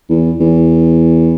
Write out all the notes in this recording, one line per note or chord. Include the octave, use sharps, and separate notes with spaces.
E2
E2